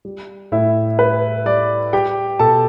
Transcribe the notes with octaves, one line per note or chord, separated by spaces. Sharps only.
G3
A2 E4 E5
G3 B4
G3 D5
G3 G4 G5
B2 A4 A5